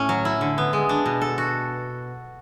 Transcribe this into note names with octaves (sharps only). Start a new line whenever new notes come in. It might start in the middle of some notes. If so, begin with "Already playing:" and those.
Already playing: A2 A3 C#4
F#3
E4
D3
B3
G#3
D4
B2
A4
F#4